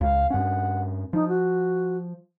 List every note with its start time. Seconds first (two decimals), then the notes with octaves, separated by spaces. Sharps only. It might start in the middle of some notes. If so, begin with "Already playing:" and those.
0.01 C#2 F5
0.30 G2 C#4 F#5
1.13 F3 D#4
1.28 F#4